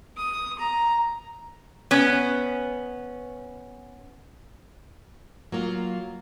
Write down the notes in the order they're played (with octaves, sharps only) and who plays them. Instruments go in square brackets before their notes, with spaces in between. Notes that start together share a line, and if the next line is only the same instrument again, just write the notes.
[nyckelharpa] D#6
A#5
[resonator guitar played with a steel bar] B3 C#4
[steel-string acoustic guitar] F#3 A#3 F4